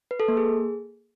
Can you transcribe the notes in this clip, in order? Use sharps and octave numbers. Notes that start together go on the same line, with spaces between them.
B4
A4
A#3
G#4